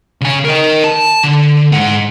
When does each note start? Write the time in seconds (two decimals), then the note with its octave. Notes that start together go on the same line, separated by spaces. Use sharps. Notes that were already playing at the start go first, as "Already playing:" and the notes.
0.21 C#3 G#5
0.45 A#4 D#5
0.84 A5
1.24 D3
1.72 G#2 F#5